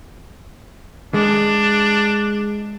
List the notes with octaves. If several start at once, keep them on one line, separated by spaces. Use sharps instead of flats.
G#3 D4